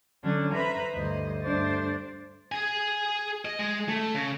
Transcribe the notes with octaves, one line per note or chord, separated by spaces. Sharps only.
D3 F#3 C#4 D4
B4 C5 E5 A#5 B5
D2 G2 C5 D#5
G2 A3 D4 C5 A6
G#4 G#5
D#5
G#3
A3
C#3